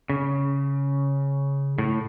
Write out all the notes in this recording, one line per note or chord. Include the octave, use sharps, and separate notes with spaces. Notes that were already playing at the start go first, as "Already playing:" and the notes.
C#3
A2